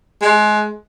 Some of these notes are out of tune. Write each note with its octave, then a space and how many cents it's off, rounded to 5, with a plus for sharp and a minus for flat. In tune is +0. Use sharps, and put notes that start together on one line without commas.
G#3 +25